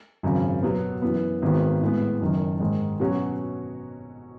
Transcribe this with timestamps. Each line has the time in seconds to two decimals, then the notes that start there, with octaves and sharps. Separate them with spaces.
0.23 G#1 F#2 C#3
0.63 B2 F#3 B3
1.02 F#2 E3 B3
1.42 G#1 G#2 D#3 G#3 B3
1.82 A2 G#3 B3
2.20 F#1 F#2 D#3
2.60 G#2 D#3 G#3
3.00 B2 F#3 C#4 F#4